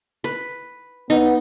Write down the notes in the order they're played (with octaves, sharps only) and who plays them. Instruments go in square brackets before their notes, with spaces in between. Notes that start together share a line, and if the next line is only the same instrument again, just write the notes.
[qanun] B4
[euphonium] B3 [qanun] D#4